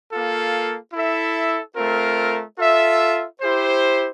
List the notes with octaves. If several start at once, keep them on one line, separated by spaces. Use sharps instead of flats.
A#3 F4 A4
E4 A4 E5
A3 C4 F4 A#4
F4 A4 E5
E4 G4 C5